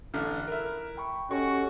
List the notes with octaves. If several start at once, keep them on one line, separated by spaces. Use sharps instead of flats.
A1 D3 F6 F#6
E4 A#4
G5 B5 C#6
C#4 F#4 G4 A4 D#5 C#6